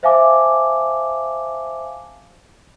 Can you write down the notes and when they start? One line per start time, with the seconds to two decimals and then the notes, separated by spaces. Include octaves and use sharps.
0.03 C5 E5 F5 G#5 A5 D6